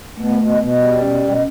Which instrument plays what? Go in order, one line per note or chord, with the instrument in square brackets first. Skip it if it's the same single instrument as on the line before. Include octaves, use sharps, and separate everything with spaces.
[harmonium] B2 [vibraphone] A3
[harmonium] B2
[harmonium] B2 [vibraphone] B3
[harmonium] G3
[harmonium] B2 [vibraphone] C#4
[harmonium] B2